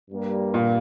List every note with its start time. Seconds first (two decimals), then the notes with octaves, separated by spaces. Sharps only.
0.10 G2 G3 A#3
0.54 A#2